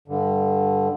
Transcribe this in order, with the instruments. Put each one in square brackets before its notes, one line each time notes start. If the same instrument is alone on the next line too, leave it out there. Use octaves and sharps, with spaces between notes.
[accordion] G2 D3